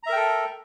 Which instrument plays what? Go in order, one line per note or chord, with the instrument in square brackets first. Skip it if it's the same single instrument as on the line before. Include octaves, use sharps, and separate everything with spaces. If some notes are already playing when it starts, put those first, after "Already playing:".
[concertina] A#5
E5
A#4
G5
A4